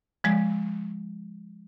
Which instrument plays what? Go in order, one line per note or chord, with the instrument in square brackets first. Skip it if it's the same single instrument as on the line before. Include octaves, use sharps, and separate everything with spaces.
[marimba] F3 G#3